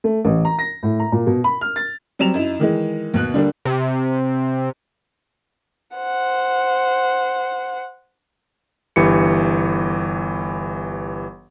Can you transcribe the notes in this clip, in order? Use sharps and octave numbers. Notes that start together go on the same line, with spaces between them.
A3
A1
A#5
A#6
A2
A#5
A#2
B2
B5
F6
A6
F#3 G3 C4 E7 F7
F#2 D#4 E4
D#3 E3 G#3
D#2 B2 F#6
D3 G3 A#3 D4
C3
C5 F#5
G1 E3 G4 C#7